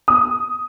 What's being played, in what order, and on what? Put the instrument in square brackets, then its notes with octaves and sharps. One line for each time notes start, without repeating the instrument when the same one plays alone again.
[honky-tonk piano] D#6